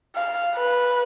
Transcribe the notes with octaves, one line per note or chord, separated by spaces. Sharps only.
F5
B4